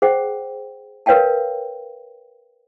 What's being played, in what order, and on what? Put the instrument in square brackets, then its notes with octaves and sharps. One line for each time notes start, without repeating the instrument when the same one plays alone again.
[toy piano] G#4 C5 F#5 G5
A#4 B4 C#5 F5 G5 A5